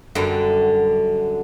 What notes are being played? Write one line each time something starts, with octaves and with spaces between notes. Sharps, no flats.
F#2 D3 G3